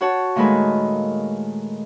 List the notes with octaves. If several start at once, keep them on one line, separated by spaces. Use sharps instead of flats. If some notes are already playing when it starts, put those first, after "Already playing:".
F#4 C#5 F#5 A5
A#2 D#3 G#3 A3 B4 G#5